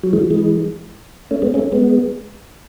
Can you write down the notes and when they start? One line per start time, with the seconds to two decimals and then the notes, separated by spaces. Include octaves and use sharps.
0.03 F#3
0.13 E3 G#3
0.31 E3 G#3
1.31 A3 C#4
1.42 G#3 B3
1.54 A3 C#4
1.72 G#3 B3